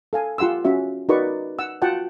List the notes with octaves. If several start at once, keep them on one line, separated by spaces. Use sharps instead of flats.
A4 F5 G#5
F4 G4 F#5 C6 E6
C#4 F#4 E5
D#4 F#4 A#4 B4 D5 C#6
F#5 E6
F4 F#4 F#5 G5 A5